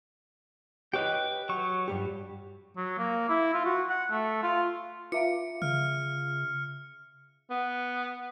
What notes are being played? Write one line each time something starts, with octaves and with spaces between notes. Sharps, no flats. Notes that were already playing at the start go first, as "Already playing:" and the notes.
G4 B4 C#5 D#5 G5
F#3 C#6
G2 G3 G4
F#3
A#3
E4
F4
F#4
F#5
A3
F4
F4 E5 F5 C#7
C#3 F6
B3